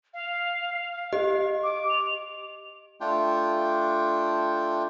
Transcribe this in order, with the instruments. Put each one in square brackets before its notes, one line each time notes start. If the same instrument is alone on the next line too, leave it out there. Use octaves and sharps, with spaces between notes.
[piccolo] F5
[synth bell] G4 D#5
[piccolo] D6
F7
[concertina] A3 D4 F4 G5